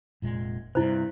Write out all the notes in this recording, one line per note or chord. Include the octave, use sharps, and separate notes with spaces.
F1 A#2 G#3
G2 C3 E4 C5